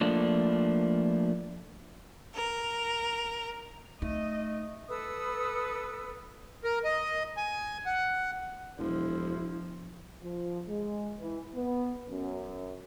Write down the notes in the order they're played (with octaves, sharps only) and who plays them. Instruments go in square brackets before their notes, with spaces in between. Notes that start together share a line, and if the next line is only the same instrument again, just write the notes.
[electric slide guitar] F3 A3 A#3 D4
[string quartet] A#4
[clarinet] A3 [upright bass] D#4 [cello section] D#5
[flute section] A4 B4 D#6 E6
[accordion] A#4
D#5
G#5
F#5
[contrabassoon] E1 [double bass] F3 [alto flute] E4
[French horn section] F3
G#3
E3
B3
F#2